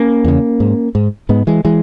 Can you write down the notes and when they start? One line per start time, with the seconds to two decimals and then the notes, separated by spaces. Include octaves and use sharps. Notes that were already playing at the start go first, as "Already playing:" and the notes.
Already playing: A#3 C#4
0.24 E2 C#3
0.60 G#2
0.95 G#2
1.29 G#2 G#3 B3
1.47 E3 G#3
1.65 E3 G#3